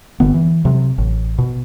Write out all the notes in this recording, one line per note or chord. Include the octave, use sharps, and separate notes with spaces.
G1 D3 B3
E3
C3 F#3
A1
B2